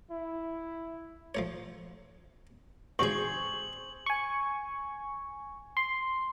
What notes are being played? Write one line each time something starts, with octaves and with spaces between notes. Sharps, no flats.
E4
F3 A3 C#5
A1 D2 G#2 C4 G#4 C#6 F#7
G#5 C#6
C6